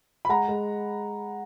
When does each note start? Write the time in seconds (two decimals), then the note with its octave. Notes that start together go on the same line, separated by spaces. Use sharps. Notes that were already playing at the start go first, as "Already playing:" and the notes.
0.25 B5
0.29 G#3 F#5 A#5
0.48 G#3